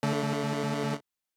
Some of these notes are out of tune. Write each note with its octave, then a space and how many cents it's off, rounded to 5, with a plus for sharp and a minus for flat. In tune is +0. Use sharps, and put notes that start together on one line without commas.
D3 -40 A3 +0